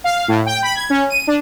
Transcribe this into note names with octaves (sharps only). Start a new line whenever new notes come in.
F5
A2
G5
B5
G#6
C#4
D#7
D4